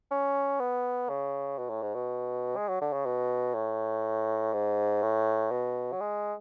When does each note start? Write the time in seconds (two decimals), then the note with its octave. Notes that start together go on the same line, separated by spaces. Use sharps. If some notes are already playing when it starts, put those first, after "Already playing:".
0.11 C#4
0.60 B3
1.09 C#3
1.58 B2
1.70 A2
1.82 G#2
1.95 B2
2.57 G#3
2.69 F#3
2.81 D3
2.93 C#3
3.06 B2
3.55 A2
4.53 G#2
5.02 A2
5.51 B2
5.92 F#3
6.01 G#3